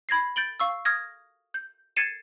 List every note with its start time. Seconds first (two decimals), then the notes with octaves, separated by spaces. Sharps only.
0.09 B5 G#6 A#6 C7
0.36 G6 A6 D7 F#7 G7
0.60 F5 C#6 E6
0.85 D#6 F6 G#6 A#6
1.54 G6
1.96 G#6 A6 C7 C#7 D#7 E7